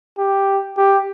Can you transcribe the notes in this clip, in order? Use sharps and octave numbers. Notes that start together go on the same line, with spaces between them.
G4
G4